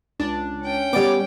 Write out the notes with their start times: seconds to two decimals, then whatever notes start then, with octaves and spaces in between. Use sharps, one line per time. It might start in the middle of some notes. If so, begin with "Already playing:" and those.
0.19 C#2 D4
0.61 C#4 G5
0.93 G3 B3 C#5 D5 D6